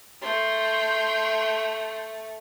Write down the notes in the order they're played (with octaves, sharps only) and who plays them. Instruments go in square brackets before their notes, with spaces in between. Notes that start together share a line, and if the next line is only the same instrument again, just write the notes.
[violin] A3 [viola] G5 C6